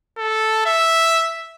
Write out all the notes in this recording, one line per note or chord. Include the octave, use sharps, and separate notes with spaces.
A4
E5